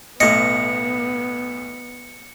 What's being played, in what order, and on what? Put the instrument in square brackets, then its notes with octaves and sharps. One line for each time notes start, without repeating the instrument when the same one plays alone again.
[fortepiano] B1 A2 [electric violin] B3 [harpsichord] D#5 [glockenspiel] C#7